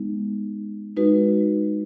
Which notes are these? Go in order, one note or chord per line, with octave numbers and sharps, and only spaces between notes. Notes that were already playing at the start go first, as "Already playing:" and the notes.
Already playing: G#3 B3 D#4
G#3 D#4 F#4 B4